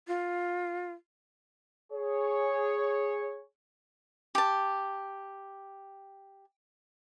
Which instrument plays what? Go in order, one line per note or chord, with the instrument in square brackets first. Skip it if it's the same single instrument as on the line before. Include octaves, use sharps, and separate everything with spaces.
[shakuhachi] F4
[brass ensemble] G#4 C#5
[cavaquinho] G4 A5